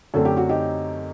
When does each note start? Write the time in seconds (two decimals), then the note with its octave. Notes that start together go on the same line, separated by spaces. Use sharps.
0.14 F#2 D3 F#3 A3 C4 A4
0.25 G4
0.37 F#4
0.49 D#4 G4